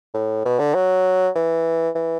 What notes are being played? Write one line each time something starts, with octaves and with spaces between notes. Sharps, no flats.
A2
B2
D3
F#3
E3
E3